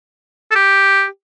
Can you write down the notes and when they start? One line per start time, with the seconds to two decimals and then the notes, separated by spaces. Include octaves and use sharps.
0.51 A4
0.55 G4